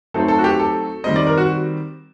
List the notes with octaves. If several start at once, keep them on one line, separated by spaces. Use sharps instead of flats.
F#3 A3 C4 D#4 A4
A4
F#4
G4
A4
D#3 G3 C4 D#5
D5
A#4
F#4